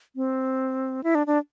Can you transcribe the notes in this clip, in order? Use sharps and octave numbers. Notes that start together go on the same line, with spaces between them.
C4
E4
D4
D4